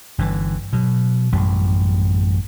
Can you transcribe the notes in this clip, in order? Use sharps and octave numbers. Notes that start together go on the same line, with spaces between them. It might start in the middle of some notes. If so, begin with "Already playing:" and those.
G1 D3 E3
B2 F#3
A1 F#2 G3